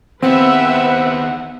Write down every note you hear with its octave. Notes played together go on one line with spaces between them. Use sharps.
D#2 B3 C4 B4 E5 F#5